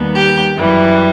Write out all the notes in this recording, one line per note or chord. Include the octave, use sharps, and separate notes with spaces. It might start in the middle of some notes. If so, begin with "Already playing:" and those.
Already playing: D#2 D#3 G3 B3
G4
F#2 E3 G3